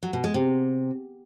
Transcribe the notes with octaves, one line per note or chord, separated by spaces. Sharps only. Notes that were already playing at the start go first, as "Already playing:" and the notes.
F#3
B2
G#3
C3